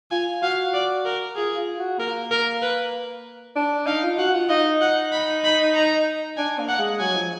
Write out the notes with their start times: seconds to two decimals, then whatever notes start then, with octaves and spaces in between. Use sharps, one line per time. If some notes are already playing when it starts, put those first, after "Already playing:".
0.11 F4 G#5
0.42 F#4 F5
0.74 D5
1.05 A#4
1.36 F4 G#4
1.57 F4
1.78 F#4
1.99 A#3 A#4
2.31 A#4
2.62 B4
3.56 D4
3.87 D#4 F5
4.03 F4
4.18 F#4 F#5
4.33 F4
4.49 D#4 D#5
4.81 F#5
5.12 B5
5.44 B5
5.75 A#5
6.37 D4 G#5
6.58 A#3
6.69 F#5
6.79 G#3
7.00 F#3 G#5
7.16 F3